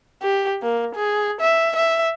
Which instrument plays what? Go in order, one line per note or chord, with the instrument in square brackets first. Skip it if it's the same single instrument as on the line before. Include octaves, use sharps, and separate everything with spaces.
[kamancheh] G4
A#3
G#4
E5
E5